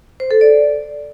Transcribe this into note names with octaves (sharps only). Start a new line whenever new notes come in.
C5
A4
D5